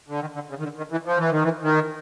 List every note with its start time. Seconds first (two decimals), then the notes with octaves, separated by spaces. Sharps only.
0.09 D3
0.21 D#3
0.35 D3
0.50 C#3
0.59 D#3
0.63 D3
0.77 D#3
0.91 E3
1.06 F3
1.18 E3
1.31 D#3
1.43 E3
1.63 D#3